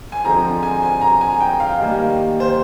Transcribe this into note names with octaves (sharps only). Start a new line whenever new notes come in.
G#5
D3 F3 G#3 C4 A#5
G#5
G#5
A#5
G#5
G5
F5
D#3 G3 A#3
C5